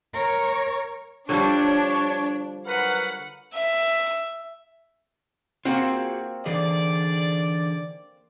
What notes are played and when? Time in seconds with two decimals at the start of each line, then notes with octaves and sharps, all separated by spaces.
0.13 A#4 C#5
1.29 D3 F3 G3 D4 C#5
2.67 F#3 A#4 B4 F#5
3.54 E5
5.65 A#3 C4 F4 F#4 G#4
6.46 D3 E3 G#4 D5